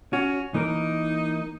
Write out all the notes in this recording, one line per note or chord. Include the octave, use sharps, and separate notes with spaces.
C#4 F#4
E3 A#3 D#4 A#4